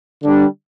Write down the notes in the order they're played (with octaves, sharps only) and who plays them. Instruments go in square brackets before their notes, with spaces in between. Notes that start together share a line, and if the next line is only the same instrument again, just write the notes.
[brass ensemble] D3 G3 B3 D4